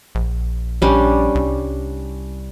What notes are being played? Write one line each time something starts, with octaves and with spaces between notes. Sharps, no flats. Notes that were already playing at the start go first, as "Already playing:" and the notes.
A#1
A#1 G3 C#4 D4
C2